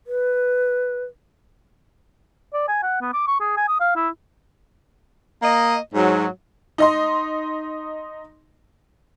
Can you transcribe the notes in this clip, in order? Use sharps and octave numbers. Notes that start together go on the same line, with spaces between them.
B4
D5
G#5
F#5
B3
D6
C#6
G#4
G#5
D#6
F5
E4
A#3 D#5
G#2 F#3
D#4 D#5 C6